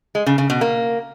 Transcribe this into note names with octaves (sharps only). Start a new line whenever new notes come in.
G#3
C#3
C#3
B2
A#3